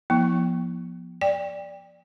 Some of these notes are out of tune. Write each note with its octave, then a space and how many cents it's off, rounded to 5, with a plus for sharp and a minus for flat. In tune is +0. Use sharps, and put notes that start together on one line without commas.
F3 +0 B3 -40 E4 -35
D5 +0 G5 +25